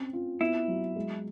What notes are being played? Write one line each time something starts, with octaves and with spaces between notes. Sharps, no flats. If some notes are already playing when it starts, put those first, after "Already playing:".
Already playing: C4 C#4
F4
B3 E4
F#3
G#3